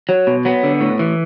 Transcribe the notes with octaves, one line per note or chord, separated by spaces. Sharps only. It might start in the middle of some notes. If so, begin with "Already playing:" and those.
F#3
B2
F#3 B3
D3
A2
E3